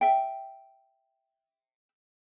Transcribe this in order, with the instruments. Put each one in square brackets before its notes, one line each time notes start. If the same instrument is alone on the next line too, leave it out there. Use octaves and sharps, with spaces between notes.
[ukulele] E5 G5